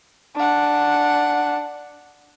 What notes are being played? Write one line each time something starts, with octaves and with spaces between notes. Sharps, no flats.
D4 F#5